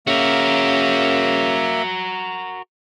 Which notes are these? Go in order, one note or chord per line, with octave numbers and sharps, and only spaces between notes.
C#3 A#3 F#4 A#4 E5